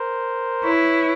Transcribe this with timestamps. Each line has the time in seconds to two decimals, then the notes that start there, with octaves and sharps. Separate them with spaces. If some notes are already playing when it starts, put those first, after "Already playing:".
Already playing: A#4 C5
0.63 E4 B4 C#5